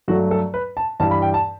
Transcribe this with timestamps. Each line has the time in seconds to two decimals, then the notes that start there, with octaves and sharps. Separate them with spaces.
0.08 G2 F#3 A3 F#4
0.31 A4
0.54 B4
0.77 A5
1.00 G2 E3 G3 A5
1.11 B5
1.22 G5
1.34 A5